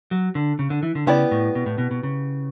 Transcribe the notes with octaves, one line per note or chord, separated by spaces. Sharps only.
F#3
D3
C#3
D3
E3
D3
C#3 B3 E4 G4 D5
A2
B2
A2
B2
B2
C#3